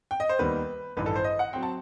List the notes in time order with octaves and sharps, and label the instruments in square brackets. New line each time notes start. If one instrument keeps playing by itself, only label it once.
[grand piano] G5
D#5
C5
D#2 D#3 G3 B3 B4
A1 G2 D#3 B4
A4
C5
D#5
F#5
F#3 C4 G5
A5